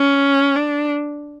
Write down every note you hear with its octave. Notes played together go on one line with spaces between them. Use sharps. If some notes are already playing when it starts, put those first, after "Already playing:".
Already playing: C#4
D4